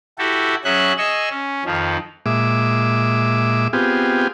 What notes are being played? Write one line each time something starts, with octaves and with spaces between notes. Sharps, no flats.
E4 F#4 G4 A4
F#3 C#4 G#4 E5 F#6
G#4 D#5 C#6 E6
C#4
F2 D#3 F3
A#2 G#3 E5 D6
B3 C4 F4 G4 G#4